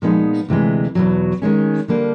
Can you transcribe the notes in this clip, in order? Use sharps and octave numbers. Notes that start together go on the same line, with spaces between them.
A#2 F3 G#3 B3 D#4
D2 C3 E3 G#3
E2 B2 F#3
D#3 G#3 C#4
D3 G3 A#3 D4